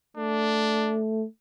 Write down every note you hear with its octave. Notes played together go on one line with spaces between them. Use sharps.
A3 D4